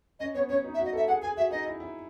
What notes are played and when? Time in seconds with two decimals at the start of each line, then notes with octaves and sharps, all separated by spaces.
0.20 C#4 D#5
0.34 B3 C#5
0.49 C#4 C#5
0.64 D#4
0.74 E5
0.79 F#4
0.85 D#5
0.93 A4 E5
1.08 G#4 F#5
1.22 G#4 G#5
1.37 F#4 E5
1.51 D#4 D#5
1.66 E4
1.80 E4